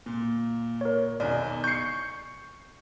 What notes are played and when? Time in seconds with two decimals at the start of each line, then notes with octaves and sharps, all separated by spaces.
0.06 A#2
0.81 A#4 C#5
1.20 B1 E2 D#3 D5
1.64 C#6 G6 C7 C#7